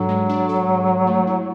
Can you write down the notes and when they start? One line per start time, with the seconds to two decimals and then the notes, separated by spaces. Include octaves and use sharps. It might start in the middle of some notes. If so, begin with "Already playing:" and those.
Already playing: G#2 F#3 D4 A4
0.09 G#3
0.30 D4
0.49 A4
0.68 G#2
0.87 G#3
1.07 A3
1.27 E4